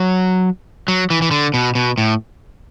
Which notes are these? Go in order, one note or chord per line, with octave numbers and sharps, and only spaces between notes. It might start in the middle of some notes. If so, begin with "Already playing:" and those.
Already playing: F#3
F#3
E3
E3
D3
B2
B2
A2